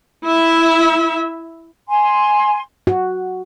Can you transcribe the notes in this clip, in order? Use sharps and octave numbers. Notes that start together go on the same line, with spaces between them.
E4 E5
G#5 C6
F#4